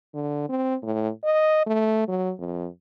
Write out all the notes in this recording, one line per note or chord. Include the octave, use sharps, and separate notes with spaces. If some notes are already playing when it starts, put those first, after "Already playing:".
D3
C4
A2
D#5
A3
F#3
F2